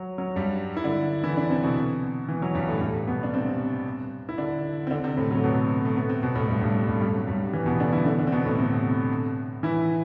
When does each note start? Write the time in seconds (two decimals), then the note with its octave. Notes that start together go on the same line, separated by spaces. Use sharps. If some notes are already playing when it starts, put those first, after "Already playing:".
Already playing: F#3
0.18 F#3
0.36 G2 G3
0.77 E4
0.84 D3 D4
1.23 E3 E4
1.37 D3 D4
1.49 C3 C4
1.63 B2 B3
2.28 E3
2.42 F#3
2.55 G2 G3
2.68 A2 A3
2.81 G2 G3
3.07 B2 B3
3.23 D4
3.34 C3 C4
4.29 E4
4.38 D3 D4
4.87 C4
4.91 D3 D4
5.04 C3 C4
5.17 A2 A3
5.31 F#3
5.37 A3
5.44 B2 B3
5.85 A3
5.97 B3
6.09 C3 C4
6.22 B2 B3
6.35 A2 A3
6.48 G2 G3
6.61 G2 G3
6.87 G2 G3
6.96 A3
7.01 G2 G3
7.14 F#3
7.27 G2 G3
7.53 E3
7.66 B2 B3
7.80 D3 D4
7.93 E3 E4
8.06 D3 D4
8.19 D3 D4
8.27 C4
8.32 B2 B3
8.45 A2 A3
8.58 C3 C4
9.63 E3 E4